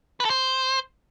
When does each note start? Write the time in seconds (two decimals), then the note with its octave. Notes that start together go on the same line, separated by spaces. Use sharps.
0.20 B4
0.25 A4
0.30 C5